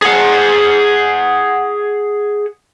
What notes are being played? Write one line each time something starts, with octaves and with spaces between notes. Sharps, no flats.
G#4 F#5